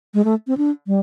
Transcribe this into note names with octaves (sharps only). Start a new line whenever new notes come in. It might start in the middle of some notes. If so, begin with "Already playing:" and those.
G#3
A3
C4
D4
G3